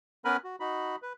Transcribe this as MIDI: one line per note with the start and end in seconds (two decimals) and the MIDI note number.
0.25 0.37 59
0.25 0.37 61
0.25 0.37 70
0.25 0.37 71
0.25 0.37 80
0.25 0.37 83
0.44 0.56 66
0.60 0.96 63
0.60 0.96 66
0.60 0.96 83
1.02 1.13 71